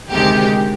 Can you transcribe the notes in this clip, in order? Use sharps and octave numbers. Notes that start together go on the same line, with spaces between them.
D2 C3 D#3 G#3 G4